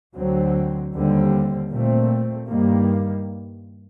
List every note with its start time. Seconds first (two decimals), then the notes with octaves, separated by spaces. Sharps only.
0.14 D2 D3 F#3 C4
0.93 D#2 D3 G3 C4
1.71 A#2 A3 C4
2.49 G2 D#3 G3 A#3